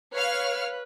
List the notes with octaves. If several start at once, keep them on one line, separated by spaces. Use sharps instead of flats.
B4 C#5 F5 F6